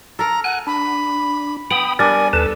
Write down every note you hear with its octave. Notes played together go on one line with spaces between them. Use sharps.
A4 A#4 A#5
F#5 G#5 F#6
D4 B5
B3 G5 B5 D#6
G3 D4 A#4 D5 G#5
D#2 A4 B4 A5